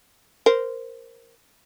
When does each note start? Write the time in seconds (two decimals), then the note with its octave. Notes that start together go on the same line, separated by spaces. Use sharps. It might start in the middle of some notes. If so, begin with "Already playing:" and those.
0.46 A#4 C5